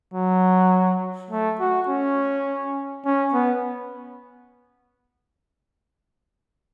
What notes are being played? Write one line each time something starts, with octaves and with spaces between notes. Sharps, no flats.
F#3
A3
F#4
C#4
C#4
B3